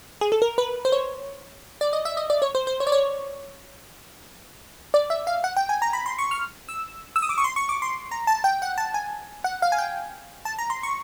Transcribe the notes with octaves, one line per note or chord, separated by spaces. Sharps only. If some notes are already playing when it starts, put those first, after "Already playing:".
G#4
A4
A#4
B4
C5
C#5
D5
D#5
E5
D#5
D5
C#5
C5
C5
C#5
D5
C#5
D5
E5
F5
F#5
G5
G#5
A#5
B5
C6
C#6
F6
E6
E6
D#6
D6
C#6
C6
C#6
D6
C6
A#5
A5
G5
F#5
A5
G#5
F#5
F5
G#5
G5
A5
A#5
C6
C#6